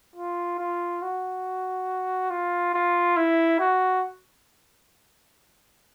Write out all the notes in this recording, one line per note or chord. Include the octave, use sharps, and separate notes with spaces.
F4
F4
F#4
F4
F4
E4
F#4